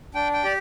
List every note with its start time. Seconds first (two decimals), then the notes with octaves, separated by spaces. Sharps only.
0.14 D4 G5
0.33 G5
0.44 G4 D5